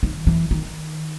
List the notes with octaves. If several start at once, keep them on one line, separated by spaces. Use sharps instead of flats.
D#3
E3
D#3